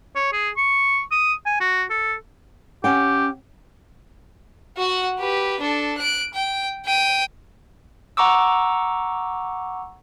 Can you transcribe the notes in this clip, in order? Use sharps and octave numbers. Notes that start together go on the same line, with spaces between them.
C#5
G#4
C#6
D#6
G#5
F#4
A4
C#4 G4 F#5 G5
F#4 F#5
G4 B4
D4 A4
F#6 D7
G5
G5 D#7
F#5 A#5 C#6 D6 E6